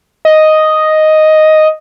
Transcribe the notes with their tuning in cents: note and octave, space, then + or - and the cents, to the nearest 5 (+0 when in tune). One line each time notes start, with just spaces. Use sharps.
D#5 +0